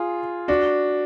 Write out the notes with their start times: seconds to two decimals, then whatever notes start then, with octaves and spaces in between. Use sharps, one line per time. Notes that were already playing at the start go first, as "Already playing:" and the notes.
Already playing: F4 G#4
0.48 D4 F#4